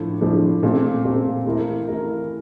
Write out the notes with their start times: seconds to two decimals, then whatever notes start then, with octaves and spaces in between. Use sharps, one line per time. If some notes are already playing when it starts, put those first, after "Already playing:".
Already playing: A2 F3 A3 D4
0.21 A2 F3 A3 D4
0.62 A#2 A3 C4
1.04 A#2 A3 C4
1.45 E3 A3 E4 A#4
1.87 E3 A3 E4 A#4